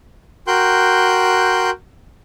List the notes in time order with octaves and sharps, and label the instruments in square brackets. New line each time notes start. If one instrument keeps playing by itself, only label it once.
[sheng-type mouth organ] F#4 A#4 G5 C6 F#6 G6